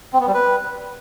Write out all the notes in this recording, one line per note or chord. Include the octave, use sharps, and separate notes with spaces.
C4
B3
G3
B4